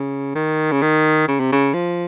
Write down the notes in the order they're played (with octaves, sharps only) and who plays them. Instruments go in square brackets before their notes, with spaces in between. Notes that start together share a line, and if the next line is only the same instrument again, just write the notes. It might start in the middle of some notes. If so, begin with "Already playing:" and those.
Already playing: [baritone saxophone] C#3
D#3
C#3
D#3
C#3
C3
C#3
F3